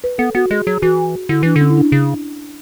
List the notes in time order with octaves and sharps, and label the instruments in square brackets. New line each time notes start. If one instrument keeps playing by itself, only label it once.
[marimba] B4
[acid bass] B3 [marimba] A4
[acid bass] B3 [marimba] F#4
[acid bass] G#3 [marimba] G#4
[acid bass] F#3 [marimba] G#4
[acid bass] E3 [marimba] F#4
[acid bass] D3 [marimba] E4
[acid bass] E3 [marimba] D4
[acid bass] D3
[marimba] C#4
E4
D4
[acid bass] C#3